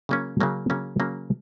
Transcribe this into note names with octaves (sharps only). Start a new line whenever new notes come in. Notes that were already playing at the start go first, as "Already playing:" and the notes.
C#3 F#3 A#3 C#4
C#3 F#3 A#3 C#4
C#3 F#3 A#3 C#4
C#3 F#3 A#3 C#4